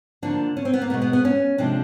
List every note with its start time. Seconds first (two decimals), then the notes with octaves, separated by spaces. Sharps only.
0.22 D3 F3 A#3 D4
0.57 C#4
0.65 C4
0.73 B3
0.82 A#3
0.90 B2 G#3 B3
1.02 B3
1.13 B3
1.25 C#4
1.58 C3 F3 G#3 D4